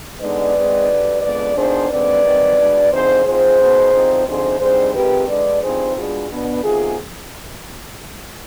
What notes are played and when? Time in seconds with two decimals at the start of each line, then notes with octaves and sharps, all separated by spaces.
0.21 D3 G#3 B3 D#4 B4 D5
0.55 G#2 D#3 G#3 C4 D#4
0.89 D2 D3 G3
1.22 F2 D3 G#3 B3 B4 D5
1.56 F2 D#3 B3 D4 G#4 C5
1.90 D#2 D3 G#3 C4 B4 D5
2.24 G#2 D#3 G3 C4
2.58 B2 G#3 D4
2.92 D2 D3 F3 C4 D#4 G#4 C5
3.25 G#2 F3 C4 G#4 C5
3.59 B2 B3 D#4
3.93 D2 D3 F3 C4 D#4
4.27 D2 D3 F3 C4 D#4 G#4 C5
4.60 D3 G3 C4 D#4 G#4 C5
4.94 F2 C3 D#3 G#3 C4 G4 B4
5.28 D3 G#3 D4 B4 D5
5.62 G2 F3 C4 D#4 G#4 C5
5.96 B2 G#3 D4 F4 G#4
6.30 B2 B3 D4
6.63 C3 D#3 B3 F4 G#4